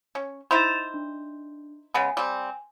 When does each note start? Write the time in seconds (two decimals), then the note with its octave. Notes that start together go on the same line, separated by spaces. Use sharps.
0.15 C#4
0.51 D#4 E4 C5 A6 E7 F7
0.94 D4
1.94 C#3 G#3 B3 G#5
2.17 G3 C4